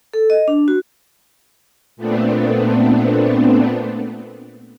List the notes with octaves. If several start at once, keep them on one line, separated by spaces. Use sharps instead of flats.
A4
D#5
D4
F#4
A#2 A3 B3 C4 D4